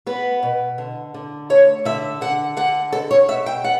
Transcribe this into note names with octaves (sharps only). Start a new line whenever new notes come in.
B3 B4
B2
D3
D3
A3 C#5
D3 E5
D3 F#5
D3 F#5
B2 A4
C#5
B2 E5
G5
B3 F#5